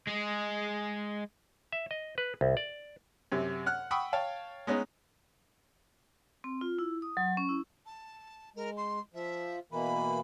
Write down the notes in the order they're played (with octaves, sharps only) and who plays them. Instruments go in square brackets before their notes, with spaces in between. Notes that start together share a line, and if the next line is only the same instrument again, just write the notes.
[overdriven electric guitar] G#3 G#4
[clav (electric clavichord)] E5
D#5
B4
C2
D5
[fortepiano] F#2 C3
F#5 F6 F#6
F#5 G5 B5 C#6 D#6 E6
C#5 F5 G5 A5
G#3 B3 C#4 D#4
[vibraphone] C4
F4
E4
D#6
F#3
C#4
E4
[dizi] A5
[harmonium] G#3 [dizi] A#4
[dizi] C6
[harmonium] F3 [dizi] E5
[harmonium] B2 E3 A#3 [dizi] B5